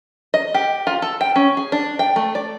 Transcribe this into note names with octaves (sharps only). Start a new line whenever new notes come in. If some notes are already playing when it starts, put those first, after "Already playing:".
D#5
G4
F4
A4
G5
C#4
G#4
D4
G5
A3
D5